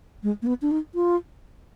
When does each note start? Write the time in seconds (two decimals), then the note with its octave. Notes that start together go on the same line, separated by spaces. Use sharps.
0.23 G#3
0.42 A#3
0.47 B3
0.62 D4
0.71 D#4
0.95 F4